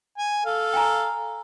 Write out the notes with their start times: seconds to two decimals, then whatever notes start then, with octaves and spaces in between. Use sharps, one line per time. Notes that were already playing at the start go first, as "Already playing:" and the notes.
0.18 G#5
0.46 A4 F5
0.73 G5 G#5 A#5